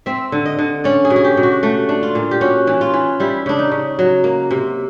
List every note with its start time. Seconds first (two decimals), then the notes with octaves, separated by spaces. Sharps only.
0.06 C4 E5
0.32 D3
0.46 D#5
0.58 D3
0.84 C#4 D5
1.05 G#4
1.10 B2
1.16 G#4
1.24 G4
1.37 B2
1.43 F#4
1.63 A3 F#4
1.89 D4
2.03 F4
2.15 A#2
2.31 G4
2.41 C#4 F#4
2.67 E3
2.81 F4
2.94 E3
3.20 G3 E4
3.46 C#3 D4
3.59 D#4
3.71 C#3
3.99 F#3
4.24 A#3
4.51 C3